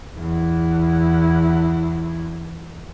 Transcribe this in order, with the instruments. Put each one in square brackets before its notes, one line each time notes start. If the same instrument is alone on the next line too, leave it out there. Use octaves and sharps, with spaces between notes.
[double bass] E2 E4